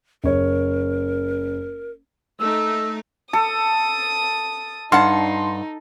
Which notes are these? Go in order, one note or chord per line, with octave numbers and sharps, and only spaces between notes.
F#1 A#4 C#5
A3 D#4 E6
A4 D#6
G2 D#4 F#5 A5 C6